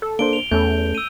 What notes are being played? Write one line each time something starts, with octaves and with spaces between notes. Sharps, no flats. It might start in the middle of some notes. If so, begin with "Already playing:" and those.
A4
A#3 D4 C5 D7 G7
F7 G7
E2 A3 C#4 A4 G6
E6 D#7